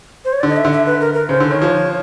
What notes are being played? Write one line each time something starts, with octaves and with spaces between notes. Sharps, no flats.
C5
C#5
D3 D5
D#5
E5
D3
E5
B4
A#4
A#4
C#3 C5
D3
D#3 C#5
F3